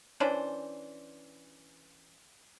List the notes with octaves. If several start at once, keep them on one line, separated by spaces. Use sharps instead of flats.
E3 C#4 D4 C5